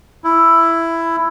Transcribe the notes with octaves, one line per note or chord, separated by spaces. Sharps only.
E4